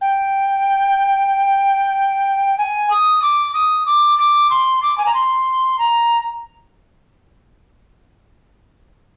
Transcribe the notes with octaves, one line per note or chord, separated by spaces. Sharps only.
G5
G#5
D#6
D6
D#6
D6
D6
C6
D6
G#5
A#5
C6
A#5